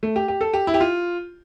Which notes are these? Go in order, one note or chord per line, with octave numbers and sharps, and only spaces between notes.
A3
G4
G4
A4
G4
E4
G4
F4